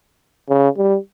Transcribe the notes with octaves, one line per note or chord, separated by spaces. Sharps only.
C#3
G3